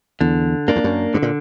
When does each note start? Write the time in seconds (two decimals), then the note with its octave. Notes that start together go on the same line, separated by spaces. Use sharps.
0.21 E2 D3
0.68 F#2 A#3 D4
0.76 E2
0.84 F#2
1.14 G2 D3
1.22 A#2